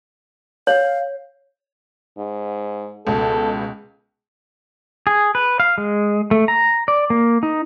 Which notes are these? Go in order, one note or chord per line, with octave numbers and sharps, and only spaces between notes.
C#5 F5
G#2
C#2 B2 A4
G#4
B4
F5
G#3
A3
A#5
D5
A#3
D#4